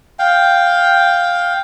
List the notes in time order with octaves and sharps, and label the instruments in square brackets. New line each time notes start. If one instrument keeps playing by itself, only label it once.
[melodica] F5 G5